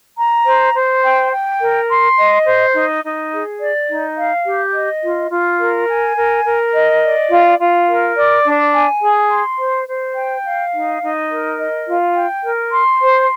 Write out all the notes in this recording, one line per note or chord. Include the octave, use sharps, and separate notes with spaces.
A#5
C5
C5
G5
G5
A#4
C6
D#5
C5
D#4
D#4
G#4
D5
D#4
F5
G4
D#5
F4
F4
A#4
G#5
A#4
A#4
D#5
D5
F4
F4
A#4
D5
D4
G#5
G#4
C6
C5
C5
G5
F5
D#4
D#4
A#4
D#5
F4
G5
A#4
C6
C5